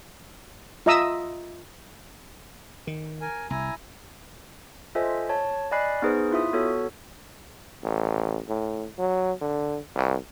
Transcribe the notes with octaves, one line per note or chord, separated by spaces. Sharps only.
F4 D#5 E5 A#5 D#6 E6
D#3
A#4 G#5
C2 E4 G#5 A#5
F4 A4 C5 D#5 E5 G#5
C#5 A5
D5 D#5 G#5 B5 F#6 C7
B3 D#4 G#4 B4 C5
E4 F4 E5 D#6
B3 F#4 A4 C#5
A1
A2
F#3
D3
C2